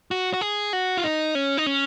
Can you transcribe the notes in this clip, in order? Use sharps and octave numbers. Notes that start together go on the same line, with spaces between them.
F#4
F#4
G#4
F#4
F4
D#4
C#4
D#4
C#4